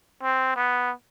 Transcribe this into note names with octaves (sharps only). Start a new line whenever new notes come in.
C4
B3